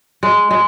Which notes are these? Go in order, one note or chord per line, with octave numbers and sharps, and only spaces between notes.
G#3
G#3